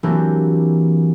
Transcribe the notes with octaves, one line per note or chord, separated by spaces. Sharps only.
E3 F#3 A#3 C4 D4 G4